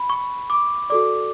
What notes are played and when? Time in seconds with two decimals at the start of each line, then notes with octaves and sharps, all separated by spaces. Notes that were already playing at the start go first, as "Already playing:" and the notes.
Already playing: B5
0.10 C#6
0.50 D6
0.90 F#4 A4 D5 D6